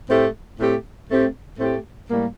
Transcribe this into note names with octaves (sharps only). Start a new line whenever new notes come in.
A2 A3 C4 G4
A2 A3 C4 G4
A2 A3 C4 G4
A2 A3 C4 G4
A2 G3 A#3